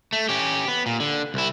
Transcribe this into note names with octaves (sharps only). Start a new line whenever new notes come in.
A3
C#4 G4
B3
A#2
D3
C2 E4